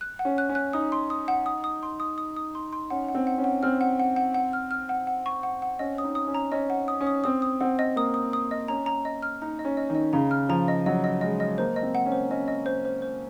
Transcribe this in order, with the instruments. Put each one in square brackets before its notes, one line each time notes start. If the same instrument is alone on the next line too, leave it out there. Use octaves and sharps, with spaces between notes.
[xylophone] F#6
F#5
[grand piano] C#4
[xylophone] F#6
[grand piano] C#4
[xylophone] F#6
[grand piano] D#4 [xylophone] D#6
[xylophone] C6
D#6
F#5
D#6
D#6
C6
D#6
D#6
D#6
C6
C6
[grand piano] C#4 [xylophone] F#5
[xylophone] F#5
[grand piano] C4
[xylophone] F#5
[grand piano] C#4
[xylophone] F#5
[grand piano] C4 [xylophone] F6
[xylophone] F#5
F#5
F#5
F#5
F6
F6
F#5
F#5
C#6
F#5
F#5
[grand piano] C#4 [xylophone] D#5
[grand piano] C#4 [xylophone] D#6
[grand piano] D#4
[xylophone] D#6
[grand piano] C#4
[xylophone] A#5
[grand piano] C#4 [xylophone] D#5
[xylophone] F#5
D#6
[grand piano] C#4
[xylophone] D#6
[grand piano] C4 [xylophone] D#6
[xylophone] D#6
[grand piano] C4 [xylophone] F#5
[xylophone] D#5
[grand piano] A#3 [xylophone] D#6
[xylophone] D#6
D#6
D#5
[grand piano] C#4 [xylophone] A#5
[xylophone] A#5
D#5
F6
[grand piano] D#4 [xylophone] A#5
[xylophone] D#5
[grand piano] C#4
[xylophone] D#5
[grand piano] D#3
[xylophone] D#5
[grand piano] C#3 [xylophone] A#5
[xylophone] F6
[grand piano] F3 [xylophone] A#5
[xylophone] D#5
[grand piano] F#3 [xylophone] D#5
[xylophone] D#5
[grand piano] G#3 [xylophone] D#5
[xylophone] D#5
[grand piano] A#3 [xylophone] C5
[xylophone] D#5
[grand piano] C4
[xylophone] F#5
[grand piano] C#4
[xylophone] C5
[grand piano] C#4 [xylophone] D#5
[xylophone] D#5
C5
C5
C5